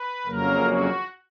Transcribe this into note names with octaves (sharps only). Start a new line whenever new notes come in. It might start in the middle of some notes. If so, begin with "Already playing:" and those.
Already playing: B4
F2 C#3 F#3 A#3 A#4
F#4